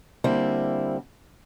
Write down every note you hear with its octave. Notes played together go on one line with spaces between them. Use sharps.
D3 G3 A#3 C4 E4